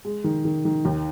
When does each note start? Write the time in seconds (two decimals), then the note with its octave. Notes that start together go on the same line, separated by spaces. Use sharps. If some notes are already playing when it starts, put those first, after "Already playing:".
0.05 G#3
0.24 D#3
0.45 D#3
0.65 D#3
0.85 D#2